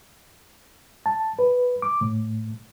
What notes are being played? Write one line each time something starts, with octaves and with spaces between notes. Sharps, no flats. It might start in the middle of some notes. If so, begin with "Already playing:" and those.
A5
B4
D6
A2